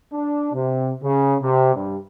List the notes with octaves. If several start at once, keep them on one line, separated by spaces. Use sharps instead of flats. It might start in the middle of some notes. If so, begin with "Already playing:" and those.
D4
C3
C#3
C3
G2